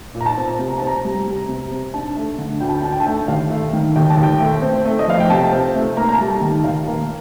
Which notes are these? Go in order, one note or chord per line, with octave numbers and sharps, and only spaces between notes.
A#2
A#5
A5
C4
C3
A#5
C4 A5
A#5
G3
C3
C3
C4
D4 A5
A3
D3
D2 G5
A5
G5
D4 A5
G5
A5
A3 G5
D#2 F5
A3
D#3
D#2 G5
A5
D#2
G5
A3
C4
A3
D#5
F3 F5
G5
C3 A5
C4
A3
A#3 A#5
A#5
A5
G3
A5
D#3
D#2 F5
A#3